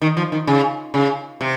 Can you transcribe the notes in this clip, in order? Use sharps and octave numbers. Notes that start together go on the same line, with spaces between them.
D#3
F3
D#3
C#3
C#3
C3